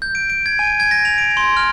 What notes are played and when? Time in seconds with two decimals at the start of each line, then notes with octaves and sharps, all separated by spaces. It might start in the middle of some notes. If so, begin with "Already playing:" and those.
0.02 G6
0.15 D7
0.30 D7
0.46 G#6
0.59 G#5
0.80 G#6
0.91 A#6
1.05 F7
1.18 D7
1.37 C6
1.57 F6